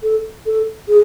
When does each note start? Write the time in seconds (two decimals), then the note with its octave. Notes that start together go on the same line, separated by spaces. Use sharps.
0.03 A4
0.46 A4
0.89 G#4